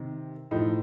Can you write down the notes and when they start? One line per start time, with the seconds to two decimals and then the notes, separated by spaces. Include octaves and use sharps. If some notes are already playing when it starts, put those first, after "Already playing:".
Already playing: C3 D#3
0.51 A2 F3 D#4